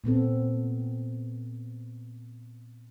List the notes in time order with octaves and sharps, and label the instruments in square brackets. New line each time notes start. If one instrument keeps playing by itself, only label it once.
[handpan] A#2 B3 C4 A4